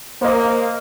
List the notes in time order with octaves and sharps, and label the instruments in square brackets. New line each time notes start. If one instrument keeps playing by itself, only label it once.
[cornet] A#3 [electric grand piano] C5 D#5